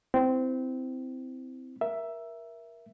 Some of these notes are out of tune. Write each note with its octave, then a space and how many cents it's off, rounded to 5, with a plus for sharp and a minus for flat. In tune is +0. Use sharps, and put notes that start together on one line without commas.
C4 -20 E4 +0
A#4 +20 E5 +5